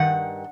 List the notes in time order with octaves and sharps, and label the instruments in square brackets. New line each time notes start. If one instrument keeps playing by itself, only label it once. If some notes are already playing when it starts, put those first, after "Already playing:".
Already playing: [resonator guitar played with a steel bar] G2 D#3 F#5